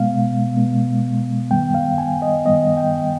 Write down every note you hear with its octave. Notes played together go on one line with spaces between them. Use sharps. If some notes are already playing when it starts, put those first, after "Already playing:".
Already playing: B2 G#3 B3 F5
B2 G#3 B3
G2 D#3 G3 B3 G5
F5
G#5
D#5
G2 D#3 G3 B3 D#5
G5